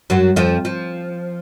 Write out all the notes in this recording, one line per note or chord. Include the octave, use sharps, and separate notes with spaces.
F#2 F#3
F2 F3
F3